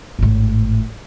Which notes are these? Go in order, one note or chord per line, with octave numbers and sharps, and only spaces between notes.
G#1 A2